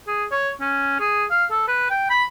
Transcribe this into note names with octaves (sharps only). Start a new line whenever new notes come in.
G#4
C#5
C#4
G#4
F5
A4
B4
G5
B5